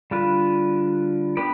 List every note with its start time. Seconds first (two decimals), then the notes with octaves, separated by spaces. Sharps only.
0.11 D3 G3 D4 F4 B4
1.37 B3 D4 G4 B4 D5